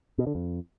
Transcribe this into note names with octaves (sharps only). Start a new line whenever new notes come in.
B2
D3
F2